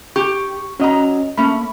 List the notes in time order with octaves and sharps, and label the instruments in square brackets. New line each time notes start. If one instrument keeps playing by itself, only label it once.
[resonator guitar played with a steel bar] G4 [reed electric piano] C#6
[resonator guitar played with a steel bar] F#3 A#5 [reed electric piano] C#4 D#5
[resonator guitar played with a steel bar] A3 C#4 [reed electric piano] A#3 B5